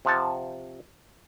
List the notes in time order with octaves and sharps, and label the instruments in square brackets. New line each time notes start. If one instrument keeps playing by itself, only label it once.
[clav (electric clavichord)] C3 F3 F#5 A5